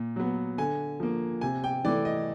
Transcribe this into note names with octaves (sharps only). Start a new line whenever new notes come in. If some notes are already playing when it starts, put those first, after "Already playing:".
Already playing: A#2
F#3 B3
D3 G#5
F3 A#3
C3 G#5
G5
E3 A3 D5
D#5